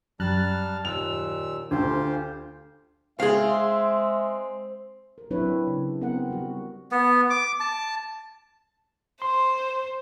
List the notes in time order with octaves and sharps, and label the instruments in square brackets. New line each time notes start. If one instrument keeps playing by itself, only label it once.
[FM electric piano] F#2 A#5 F#6 [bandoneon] G3 A5 F6
[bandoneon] D#2 A#2 E6 [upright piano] F7
[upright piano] D2 [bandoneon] F4 G4 C5 [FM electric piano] G#5
[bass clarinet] G#3 [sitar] C4 [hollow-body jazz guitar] G#4 F5 [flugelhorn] E5
[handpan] A#4
F#3 C4 D4 E4 B4 C#5
C#3
B3 C4 A#4 F#5
G3 F#4
[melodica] B3
D6
A5
[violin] C5 [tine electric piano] C6